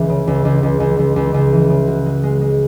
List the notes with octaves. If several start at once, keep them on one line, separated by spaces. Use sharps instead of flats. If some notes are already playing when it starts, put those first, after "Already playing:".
Already playing: C#2 E3
C#3
C#2
C#2
C#2
C#2
C#2
C#2
C#2
E3
C#3
F#4
G#3
G#3
G#3